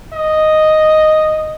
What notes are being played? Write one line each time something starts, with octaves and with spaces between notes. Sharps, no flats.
D#5